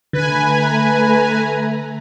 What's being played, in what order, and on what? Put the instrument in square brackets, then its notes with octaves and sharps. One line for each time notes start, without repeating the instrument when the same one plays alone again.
[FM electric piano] D3 [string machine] A3 A#5 [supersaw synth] B4 G#5